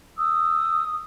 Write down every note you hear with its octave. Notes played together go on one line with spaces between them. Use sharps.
D#6 E6